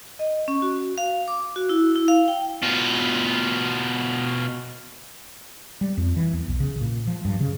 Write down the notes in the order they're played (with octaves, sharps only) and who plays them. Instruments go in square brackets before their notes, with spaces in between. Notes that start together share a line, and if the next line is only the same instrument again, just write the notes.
[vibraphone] D#5
C#4
F#4
F5
D6
F#4
E4
E4
F5
G5
[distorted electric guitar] B2 F4
[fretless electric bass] G3
F2
E3
E2
B1
C#3
A#2
F3
G2
C#3